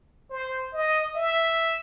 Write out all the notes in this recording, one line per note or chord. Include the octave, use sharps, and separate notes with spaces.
C5
D#5
E5